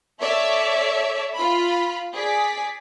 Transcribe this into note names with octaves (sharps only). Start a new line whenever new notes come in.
A4 C#5 D5 E5
F4 B5
G#4 D5 B6